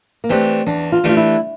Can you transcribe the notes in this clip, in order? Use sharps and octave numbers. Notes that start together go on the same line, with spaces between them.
A#3
E3 A3 C4 D4 G4
E2 D4
F4
E3 A3 D4 F4 G4
E4